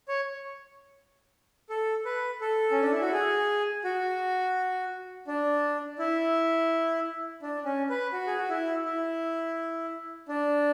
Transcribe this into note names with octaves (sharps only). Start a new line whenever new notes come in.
C#5
A4
B4
A4
C#4
D4
E4
F#4
G#4
F#4
D4
E4
D4
C#4
B4
F#4
G#4
F#4
E4
E4
D4